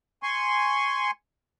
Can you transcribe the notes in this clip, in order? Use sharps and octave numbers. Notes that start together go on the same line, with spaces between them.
G#5 C6 C#6